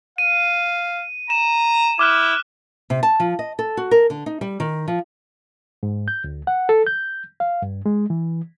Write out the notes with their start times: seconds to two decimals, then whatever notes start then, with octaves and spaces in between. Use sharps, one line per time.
0.18 F5 D#7
1.30 A#5 E7
1.99 E4 D6 F6 F#6
2.90 C3
3.03 A5
3.20 F3
3.39 D#5
3.59 A4
3.77 F#4
3.91 A#4
4.10 D3
4.26 D#4
4.41 G3
4.60 D#3
4.88 F3
5.83 G#2
6.08 G6
6.24 D2
6.47 F#5
6.69 A4
6.87 G6
7.40 F5
7.62 G2
7.86 G#3
8.10 E3